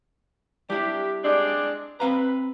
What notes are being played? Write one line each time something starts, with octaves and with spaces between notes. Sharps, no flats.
G3 D4 E4 G4
G#3 C4 D4
C4 B4 F5 A#5